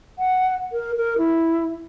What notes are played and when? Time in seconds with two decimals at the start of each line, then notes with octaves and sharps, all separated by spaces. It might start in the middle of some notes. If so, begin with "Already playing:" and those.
0.19 F#5
0.72 A#4
0.97 A#4
1.18 E4